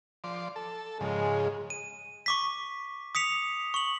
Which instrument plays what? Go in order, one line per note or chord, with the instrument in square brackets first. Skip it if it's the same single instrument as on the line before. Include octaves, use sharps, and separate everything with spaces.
[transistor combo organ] F3 D5 C6
A4
[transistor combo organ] G#2 C#3 F3 [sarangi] G#3
[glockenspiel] D#7
C#6 D6 B6
D#6 B6 C#7 F7
C#6 F#7